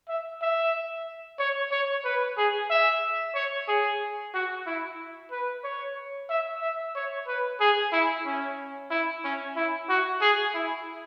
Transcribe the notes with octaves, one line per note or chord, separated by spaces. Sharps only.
E5
E5
C#5
C#5
B4
G#4
E5
C#5
G#4
F#4
E4
B4
C#5
E5
E5
C#5
B4
G#4
E4
C#4
E4
C#4
E4
F#4
G#4
E4